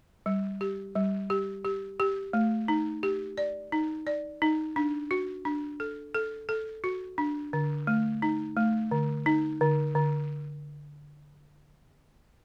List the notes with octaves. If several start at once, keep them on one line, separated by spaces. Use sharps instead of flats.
G3
G4
G3
G4
G4
G4
A3
D#4
G4
D5
D#4
D5
D#4
D4
F#4
D4
A4
A4
A4
F#4
D4
D3
A3
D#4
A3
D3
D#4
D3
D3